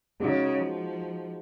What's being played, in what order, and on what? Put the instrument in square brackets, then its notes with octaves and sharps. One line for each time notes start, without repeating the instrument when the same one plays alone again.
[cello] C#3 [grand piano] G#3 D#4 F#4
[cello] F3